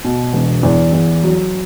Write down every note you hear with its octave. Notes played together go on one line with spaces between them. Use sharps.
B2
E1
E2
E2
F#3